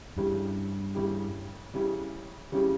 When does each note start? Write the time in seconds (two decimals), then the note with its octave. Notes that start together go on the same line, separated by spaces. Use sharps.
0.17 G2 C#3 G3 C#4 E4 G4
0.95 C#3 G3 C#4 E4 G4
1.74 C#3 G3 C#4 E4 G4
2.52 C#3 G3 C#4 E4 G4